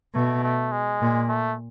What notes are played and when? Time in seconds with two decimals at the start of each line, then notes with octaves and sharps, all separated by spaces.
0.14 B2 A3
0.43 A3
0.72 G#3
1.01 A#2
1.28 A3